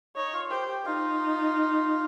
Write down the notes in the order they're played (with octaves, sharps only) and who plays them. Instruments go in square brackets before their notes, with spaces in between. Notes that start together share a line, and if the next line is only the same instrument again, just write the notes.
[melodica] D#4 D#5 [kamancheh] C#5
[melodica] F4 F5
[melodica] G4 G5 [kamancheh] C5
[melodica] G4 G5
[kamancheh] D#4 [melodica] F4 F5